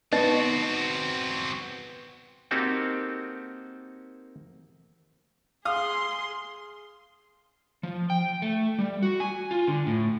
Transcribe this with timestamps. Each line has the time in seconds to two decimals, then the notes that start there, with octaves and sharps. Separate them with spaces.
0.13 B3 C4 D#4 F#4 D#5
2.51 A#3 C4 D#4 F#4 G4 A4
5.65 G#4 F5 C6 D#6
7.83 F3
8.10 G5
8.42 A3
8.78 G3
9.03 F#4
9.20 G#5
9.51 F4
9.67 D3
9.87 A2